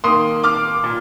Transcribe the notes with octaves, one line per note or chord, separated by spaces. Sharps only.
D#3 A#3 C6 D#6
D6 F6
A#2